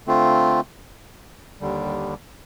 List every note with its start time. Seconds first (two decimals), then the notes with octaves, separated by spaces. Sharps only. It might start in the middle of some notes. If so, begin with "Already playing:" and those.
0.07 D3 A3 C4 F4
1.60 D#2 D3 G3